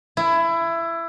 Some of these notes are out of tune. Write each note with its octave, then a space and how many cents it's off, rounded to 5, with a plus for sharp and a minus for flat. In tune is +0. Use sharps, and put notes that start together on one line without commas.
E4 +20